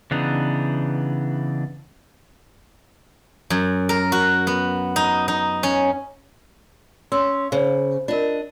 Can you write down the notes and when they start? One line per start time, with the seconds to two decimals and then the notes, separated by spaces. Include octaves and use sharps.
0.11 C#3 E3 B3 D4 D#4
3.50 F#2
3.89 A#4
4.12 F#4
4.47 B3
4.96 D#4
5.28 D#4
5.63 C#4
7.12 C#4 C6 E6
7.52 C#3 C5
8.08 D4 F4 A#4 D#5